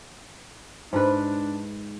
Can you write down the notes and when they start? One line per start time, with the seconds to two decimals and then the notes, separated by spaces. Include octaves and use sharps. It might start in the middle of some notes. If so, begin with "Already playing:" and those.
0.93 G#2 D4 B4